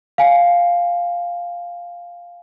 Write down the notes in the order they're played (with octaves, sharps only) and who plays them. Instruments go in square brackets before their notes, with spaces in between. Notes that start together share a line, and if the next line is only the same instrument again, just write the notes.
[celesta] F5 G#5